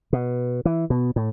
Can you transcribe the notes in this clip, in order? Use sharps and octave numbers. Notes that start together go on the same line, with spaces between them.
B2
E3
B2
A2